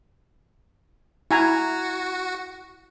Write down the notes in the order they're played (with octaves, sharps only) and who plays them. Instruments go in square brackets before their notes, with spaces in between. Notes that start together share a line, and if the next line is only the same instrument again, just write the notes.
[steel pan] E4 G#5 A#5 [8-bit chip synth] F#4